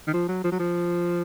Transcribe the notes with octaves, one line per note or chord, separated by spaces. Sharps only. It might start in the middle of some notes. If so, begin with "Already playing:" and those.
D#3
F3
F#3
F3
F#3
F3